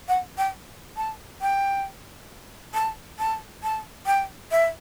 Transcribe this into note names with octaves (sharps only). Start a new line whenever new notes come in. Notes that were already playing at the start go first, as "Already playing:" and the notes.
F#5
G5
A5
G5
A5
A5
A5
G5
E5